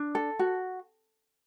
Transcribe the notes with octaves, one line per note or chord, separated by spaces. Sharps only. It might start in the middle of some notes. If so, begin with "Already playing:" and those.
Already playing: D4
A4
F#4